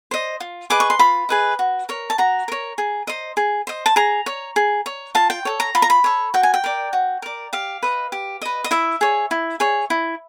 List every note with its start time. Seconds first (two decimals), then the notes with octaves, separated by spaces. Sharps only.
0.11 C5 D#5
0.40 F4
0.70 G#4 B4 D#5 D6
0.80 C#6
0.90 C6
0.99 F4 B5
1.29 G#4 B4 D#5
1.59 F#4
1.89 A#4 C#5
2.10 A5
2.18 F#4 A#5
2.48 A#4 C#5
2.78 G#4
3.07 C5 D#5
3.37 G#4
3.67 C5 D#5
3.86 A5
3.96 G#4 A#5
4.26 C#5
4.56 G#4
4.86 C#5
5.15 F4 A5
5.30 G5
5.45 A4 C#5
5.60 A#5
5.75 F4 B5
5.82 A#5
5.90 B5
6.04 A4 C#5
6.34 F#4 G5
6.43 G#5
6.54 G5
6.64 A#4 D5
6.93 F#4
7.22 A#4 D5
7.53 G4 F5
7.83 B4 D#5
8.12 G4
8.41 B4 D#5
8.64 D#5
8.71 E4 E5
9.01 G#4 C#5
9.31 E4
9.60 G#4 C#5
9.90 E4